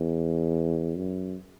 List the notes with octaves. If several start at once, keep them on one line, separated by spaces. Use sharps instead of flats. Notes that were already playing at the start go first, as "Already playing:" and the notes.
Already playing: E2
F#2